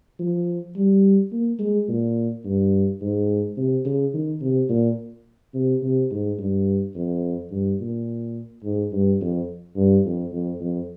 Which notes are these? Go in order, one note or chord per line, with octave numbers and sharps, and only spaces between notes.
F3
G3
A#3
G#3
A#2
G2
G#2
C3
C#3
D#3
C3
A#2
C3
C3
G#2
G2
F2
G2
A#2
G#2
G2
F2
G2
F2
F2
F2